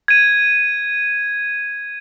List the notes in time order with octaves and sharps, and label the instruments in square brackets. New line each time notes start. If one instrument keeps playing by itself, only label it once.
[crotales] G#6 D#7